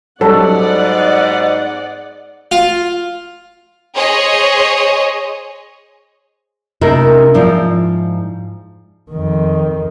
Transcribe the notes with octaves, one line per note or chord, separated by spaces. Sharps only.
G#2 F#3 G3 C#4 A4 D5 D#5 F#5
F4
G#4 C5 C#5 D#5
C3 A3 C#4 D#4 E4 A#4
G#2 F3 E4 D5
F2 D#3